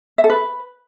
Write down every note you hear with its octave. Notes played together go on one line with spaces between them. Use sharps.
E5
A4
B4